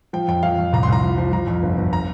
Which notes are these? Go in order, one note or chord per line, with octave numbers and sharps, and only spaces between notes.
F3 G5
F2 G5
F2 F5
F2
C2 A#5
C6
C2 A#5
F3
F3
F3 A#5
F2
G1
G1
A#5